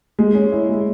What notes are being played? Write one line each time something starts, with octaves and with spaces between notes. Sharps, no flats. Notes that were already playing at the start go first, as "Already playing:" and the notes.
G#3
C#4
E4
G#3